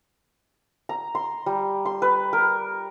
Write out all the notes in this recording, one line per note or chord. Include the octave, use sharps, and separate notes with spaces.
A#5
C6
G3
C6
B4
A#4